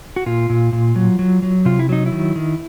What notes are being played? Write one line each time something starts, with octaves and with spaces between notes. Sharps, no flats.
F#4
A#2 F4
A#2
A#2
F#3
F#3
F#3
C3 F4
E4
F#3 D#4
E4
D#3
D#3